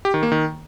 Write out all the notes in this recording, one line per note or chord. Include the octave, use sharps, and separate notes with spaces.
G4
D#3
A#3
D#3